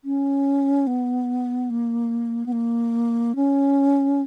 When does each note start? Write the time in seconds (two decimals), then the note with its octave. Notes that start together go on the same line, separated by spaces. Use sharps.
0.04 C#4
0.87 B3
1.70 A#3
2.46 B3
2.52 A#3
3.35 C#4